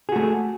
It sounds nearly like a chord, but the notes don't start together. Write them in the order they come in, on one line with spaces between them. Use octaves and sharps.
G#4 F#4 A3